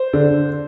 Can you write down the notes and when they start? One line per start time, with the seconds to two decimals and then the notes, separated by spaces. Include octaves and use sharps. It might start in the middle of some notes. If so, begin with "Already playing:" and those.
Already playing: C5
0.13 D3